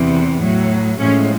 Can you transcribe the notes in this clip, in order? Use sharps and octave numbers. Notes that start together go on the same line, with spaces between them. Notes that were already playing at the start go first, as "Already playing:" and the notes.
Already playing: E2 C3 E3
A2 F#3
A2 F3 G#3 C#4